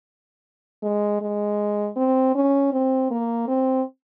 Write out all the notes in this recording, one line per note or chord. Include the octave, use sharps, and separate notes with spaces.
G#3
G#3
C4
C#4
C4
A#3
C4